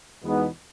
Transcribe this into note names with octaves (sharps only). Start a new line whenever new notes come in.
E2 B2 G#3 B3 D#4